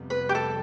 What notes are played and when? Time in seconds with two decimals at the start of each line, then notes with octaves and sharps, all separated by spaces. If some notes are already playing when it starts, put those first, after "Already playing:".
Already playing: F2 C3 G3 B3
0.10 B4
0.29 G4
0.35 A4